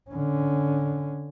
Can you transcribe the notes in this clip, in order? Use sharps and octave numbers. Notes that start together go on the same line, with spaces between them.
D3 C#4